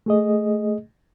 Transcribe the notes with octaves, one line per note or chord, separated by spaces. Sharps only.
A3 G#4 D#5